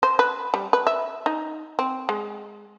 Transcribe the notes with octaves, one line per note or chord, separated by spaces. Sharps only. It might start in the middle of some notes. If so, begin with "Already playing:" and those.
C5
B4
G3
B4
E5
D#4
C4
G#3